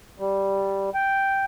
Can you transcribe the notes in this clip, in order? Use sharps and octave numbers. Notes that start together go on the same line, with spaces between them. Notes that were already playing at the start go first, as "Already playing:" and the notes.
G3
G5